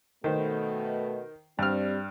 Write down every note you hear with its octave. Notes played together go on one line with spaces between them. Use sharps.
B2 D#3 A3 C5
G2 G3 C4 F6